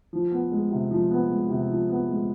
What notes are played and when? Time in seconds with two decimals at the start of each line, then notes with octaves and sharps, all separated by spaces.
0.13 F3
0.31 B3
0.52 G#3
0.70 C3
0.91 F3
1.11 B3
1.30 G#3
1.49 C3
1.70 F3
1.89 B3
2.09 G#3